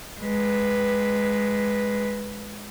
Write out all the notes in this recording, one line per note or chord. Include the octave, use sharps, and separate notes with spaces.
G#3 B4